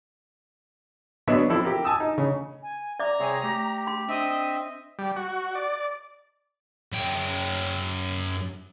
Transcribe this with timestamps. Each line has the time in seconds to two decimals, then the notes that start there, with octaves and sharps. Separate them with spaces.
1.28 F#3 B3 D4 C#5 D#5 E5
1.50 F3 C4 E4 A4
1.65 G4 A#4
1.84 G#5 A5 D#6 E6
2.00 D#4
2.18 C#3
2.63 G#5
2.99 D5 E5 A#5 D6
3.20 C2 C4 G#4 C#5 G#5
3.43 A3 G4
3.87 C6
4.08 C4 D4 D#5 E5
4.99 G3
5.16 F#4
5.55 D5
6.92 F#2 G5